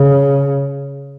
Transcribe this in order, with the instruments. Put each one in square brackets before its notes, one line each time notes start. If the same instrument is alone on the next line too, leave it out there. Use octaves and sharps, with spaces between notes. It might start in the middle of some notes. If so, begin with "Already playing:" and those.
Already playing: [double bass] C#3